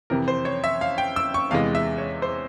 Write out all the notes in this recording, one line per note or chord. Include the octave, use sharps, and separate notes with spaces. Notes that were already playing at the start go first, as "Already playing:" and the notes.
F2 C3 E3 A#4
C5
C#5
E5
F5
G5
E6
C#6
E2 C3 E3 G#3 F5
E5
C#5
C5